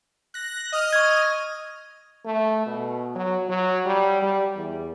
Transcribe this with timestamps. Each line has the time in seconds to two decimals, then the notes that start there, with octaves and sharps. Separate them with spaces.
0.34 F#6 A#6
0.72 D#5 D#6 F6
0.93 C#6 E6 G#6
2.25 A3
2.66 B2
3.15 F#3
3.49 F#3
3.86 G3
4.22 G3
4.56 E2